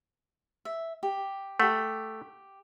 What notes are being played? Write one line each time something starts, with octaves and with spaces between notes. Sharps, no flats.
E5
G4
A3 G4 F#5